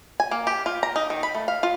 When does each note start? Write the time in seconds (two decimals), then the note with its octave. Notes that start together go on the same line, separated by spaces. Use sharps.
0.20 G#5
0.31 A#3
0.47 G4
0.66 F4
0.83 A#5
0.96 D#4
1.10 D#3
1.23 B5
1.35 A3
1.48 F5
1.63 F4